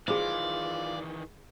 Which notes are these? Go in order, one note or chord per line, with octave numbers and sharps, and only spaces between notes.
D#3 E3 F4 G#4 C5 D5